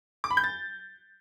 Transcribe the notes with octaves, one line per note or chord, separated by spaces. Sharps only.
D6
B5
G6
A6